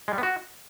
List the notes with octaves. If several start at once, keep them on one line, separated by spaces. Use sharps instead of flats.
G#3
G3
B3
F#4